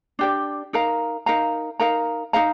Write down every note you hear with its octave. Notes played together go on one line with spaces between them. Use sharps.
D4 G4 D5
D#4 A#4 F5 A#5
D#4 A#4 F5 A#5
D#4 A#4 F5 A#5
D#4 A#4 F5 A#5